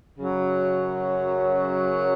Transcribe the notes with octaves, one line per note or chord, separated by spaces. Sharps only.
F#2 C#3 F#3